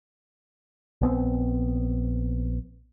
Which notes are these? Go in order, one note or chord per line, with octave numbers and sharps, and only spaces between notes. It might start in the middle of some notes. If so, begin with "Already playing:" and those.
A#1 B3 C4